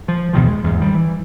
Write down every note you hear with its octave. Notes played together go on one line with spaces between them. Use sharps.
F3
E2 B2 D#3 F3
G#3
E2 G#2
D#3 G3
E3